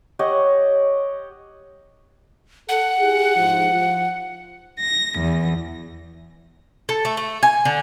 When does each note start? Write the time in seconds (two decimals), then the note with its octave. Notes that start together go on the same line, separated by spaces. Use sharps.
0.19 G4 C#5 D#5 F#5
2.69 A4 F#5
2.98 E4 G4 G#4
3.37 G#2 F3
3.70 F3
4.81 A#6
5.20 E2
6.89 A4
7.05 A3
7.17 A3
7.43 G#5
7.65 D3